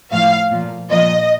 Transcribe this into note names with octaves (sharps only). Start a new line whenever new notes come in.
A2 F3 F5
A#2 F3
A#2 F3 D#5